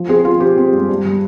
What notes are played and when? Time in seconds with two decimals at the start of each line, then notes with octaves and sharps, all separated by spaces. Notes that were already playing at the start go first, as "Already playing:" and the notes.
Already playing: F3
0.09 C4 G#4
0.25 F3 F4
0.40 C4 G4
0.58 C4
0.73 G2
0.89 G2
1.05 G3